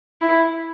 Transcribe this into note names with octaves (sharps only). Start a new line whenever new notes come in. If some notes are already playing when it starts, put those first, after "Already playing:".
E4